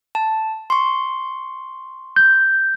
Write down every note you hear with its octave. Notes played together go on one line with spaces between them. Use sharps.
A5
C6 C#6
G6